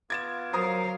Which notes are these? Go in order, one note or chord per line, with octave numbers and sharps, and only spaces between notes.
B3 F4 D6 G#6 A6 E7
F#3 A#4 C5 F5 A#5 D#6